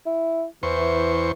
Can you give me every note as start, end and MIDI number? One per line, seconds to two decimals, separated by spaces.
0.06 0.45 64
0.63 1.32 40
0.63 1.33 52
0.63 1.32 72
0.63 1.32 85